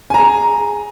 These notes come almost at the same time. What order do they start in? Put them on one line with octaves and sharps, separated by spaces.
G#5 A#5 G#4